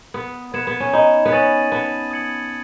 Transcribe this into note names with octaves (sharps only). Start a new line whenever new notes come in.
B3 D#6
B3 G#6 C#7 E7
B3
C#4
D#4 B5
B3
C#4 D#6 A6 D#7 F#7
B3 A5
D#6 G#6 C#7 F#7